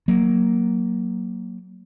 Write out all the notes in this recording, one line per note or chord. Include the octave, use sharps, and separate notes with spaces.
F#3 A#3